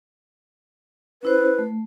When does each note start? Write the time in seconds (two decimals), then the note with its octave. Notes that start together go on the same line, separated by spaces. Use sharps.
1.23 C#4 E4 B4 C5
1.58 A3